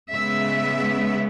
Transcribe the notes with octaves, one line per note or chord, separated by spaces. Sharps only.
C#3 G#3 B3 E5